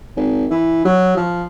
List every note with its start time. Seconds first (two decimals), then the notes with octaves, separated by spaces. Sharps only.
0.16 G#1
0.50 E3
0.85 F#3
1.16 F3